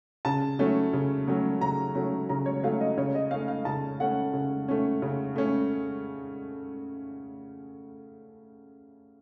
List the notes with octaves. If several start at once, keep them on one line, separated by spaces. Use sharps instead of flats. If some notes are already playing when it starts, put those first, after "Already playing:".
C#3 A5
F#3 A3 C#4
C#3
F#3 A3 C#4
C#3 A#5
F#3 A3 C#4
C#3 A#5
C#5
F#3 A3 C#4 F5
D#5
C#3 C#5
D#5
A3 C#4 F5
F5
C#3 A5
A3 C#4 F#5
C#3
A3 C#4
C#3
A3 C#4